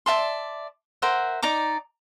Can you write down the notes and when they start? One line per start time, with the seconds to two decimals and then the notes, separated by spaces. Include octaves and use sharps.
0.06 D5 E5 A5 C6
1.02 A#4 C5 E5 F#5
1.42 D#4 D5 A#5 D6